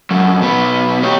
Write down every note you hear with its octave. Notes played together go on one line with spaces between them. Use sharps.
F2 F#3
B1 B3
G4 C#5